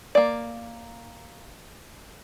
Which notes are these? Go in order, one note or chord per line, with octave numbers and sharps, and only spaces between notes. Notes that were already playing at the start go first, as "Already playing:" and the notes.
A#3 D5